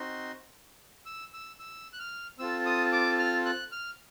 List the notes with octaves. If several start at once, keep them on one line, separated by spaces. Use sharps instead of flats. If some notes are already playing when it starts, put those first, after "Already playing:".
Already playing: C4 D#4 F#4 C6
E6
E6
E6
F#6
F6
C4 F4 A4 E6
D#6
D6
F6
F#6
F6